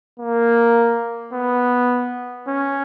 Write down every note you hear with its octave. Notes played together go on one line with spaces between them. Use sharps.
A#3
B3
C#4